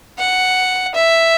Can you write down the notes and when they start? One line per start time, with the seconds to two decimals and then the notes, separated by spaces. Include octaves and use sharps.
0.19 F#5
0.95 E5